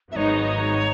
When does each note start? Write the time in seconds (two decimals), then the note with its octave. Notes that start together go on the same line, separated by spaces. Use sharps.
0.12 G#1 G#2 F#3 B3 D#4 C#5 E5